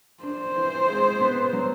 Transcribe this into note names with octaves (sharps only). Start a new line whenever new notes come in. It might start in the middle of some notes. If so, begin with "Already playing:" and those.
D4 C5
E3
G#3
B3
F#3